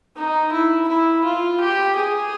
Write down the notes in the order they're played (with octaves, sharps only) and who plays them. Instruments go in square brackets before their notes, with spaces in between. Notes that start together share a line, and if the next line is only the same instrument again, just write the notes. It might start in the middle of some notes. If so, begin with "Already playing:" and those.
[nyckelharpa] D#4
E4
E4
F4
G4
G#4